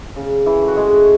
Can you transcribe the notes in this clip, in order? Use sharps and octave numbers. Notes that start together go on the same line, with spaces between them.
C#3
E3 E4
A3
F#4
G#3 G#4